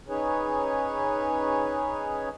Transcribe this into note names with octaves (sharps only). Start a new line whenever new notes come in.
C#4 D#4 G#4 B4 C#5